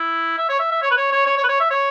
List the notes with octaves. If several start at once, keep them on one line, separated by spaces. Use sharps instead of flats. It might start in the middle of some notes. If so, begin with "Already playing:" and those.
Already playing: E4
E5
C#5
E5
E5
C#5
B4
C#5
C#5
C#5
C#5
B4
C#5
E5
C#5